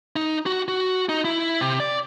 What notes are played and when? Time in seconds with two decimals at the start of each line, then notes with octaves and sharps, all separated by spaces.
0.16 D#4
0.46 F#4
0.68 F#4
1.09 D#4
1.25 E4
1.61 C3
1.80 D5